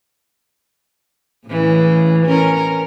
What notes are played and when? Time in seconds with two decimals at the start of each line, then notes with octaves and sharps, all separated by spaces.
1.46 A2 C#3 E3
2.26 C#4 A#4